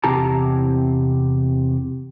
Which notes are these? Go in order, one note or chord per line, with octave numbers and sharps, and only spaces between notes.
E2 C3 E4 G4 A5 A#5